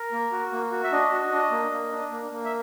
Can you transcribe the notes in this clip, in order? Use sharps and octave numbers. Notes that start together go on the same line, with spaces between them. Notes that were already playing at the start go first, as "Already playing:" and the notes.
Already playing: A#4
A#3
F#4
A#3
F#4
E5
D4 D#5
F#4
D4
A#3
A#3
D4
A#3
A#3
E5